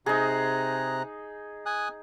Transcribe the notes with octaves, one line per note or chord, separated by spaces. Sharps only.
C3 D#4 G#4 A#5 F#6
G#5 D#6 F#6